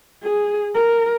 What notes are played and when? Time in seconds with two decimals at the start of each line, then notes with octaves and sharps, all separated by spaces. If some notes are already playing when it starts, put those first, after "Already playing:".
0.23 G#4
0.75 A#4